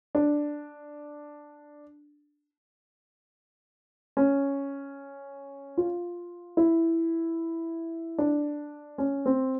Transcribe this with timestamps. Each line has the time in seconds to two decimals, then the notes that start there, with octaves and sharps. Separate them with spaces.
0.15 D4
4.17 C#4
5.78 F4
6.57 E4
8.18 D4
8.98 C#4
9.26 C4